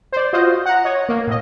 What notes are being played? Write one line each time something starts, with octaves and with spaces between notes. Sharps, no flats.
C5 D5
F4 F#4 C5 D#5
F#5 A#5
C#5 D#5
A#3
A2 D#5